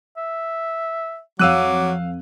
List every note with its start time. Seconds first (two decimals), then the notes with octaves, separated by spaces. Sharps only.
0.17 E5
1.39 F2 F#3 F5 D6 E6 F#6 D#7